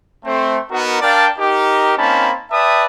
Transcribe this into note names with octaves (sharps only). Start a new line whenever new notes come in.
A3 C4 C5
B3 D#4 F#4 A#4
D4 A#4 D5 F5 G5 A5
D#4 G4 A#4
A#3 C4 C#4 D#4 A5 B5
B4 D5 E5 G5 A5 D#6